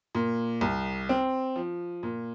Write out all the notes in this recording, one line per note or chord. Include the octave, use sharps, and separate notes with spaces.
A#2
C2
C4
F3
A#2